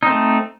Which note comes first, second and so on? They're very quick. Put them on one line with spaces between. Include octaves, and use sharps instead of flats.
D#4 C4 A3